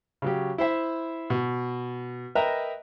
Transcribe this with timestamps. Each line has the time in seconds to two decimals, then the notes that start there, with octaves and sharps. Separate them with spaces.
0.22 C#3 F#3 G4
0.58 E4 C5 E5
1.30 B2
2.35 A#4 B4 D#5 E5 G5 A#5